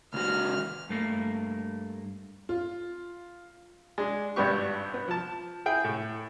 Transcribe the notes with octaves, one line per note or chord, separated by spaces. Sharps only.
C#2 F#4 F6
G2 A3 A#3
F4
G#3 D4
G#1 G2 G3 B3 G4 C#6
B3
F3 A5
E4 G#4 G5
A2